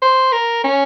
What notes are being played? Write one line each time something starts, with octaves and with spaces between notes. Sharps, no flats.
C5
A#4
C#4